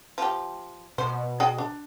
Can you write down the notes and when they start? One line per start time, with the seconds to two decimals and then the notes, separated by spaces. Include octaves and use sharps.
0.18 F3 G4
0.98 B2 C5
1.40 G#4 D#5 G5
1.58 D4